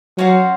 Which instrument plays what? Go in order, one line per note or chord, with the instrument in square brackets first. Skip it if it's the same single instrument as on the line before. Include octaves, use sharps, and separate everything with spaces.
[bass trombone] F#3 [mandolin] C#4 F#4 C5 F5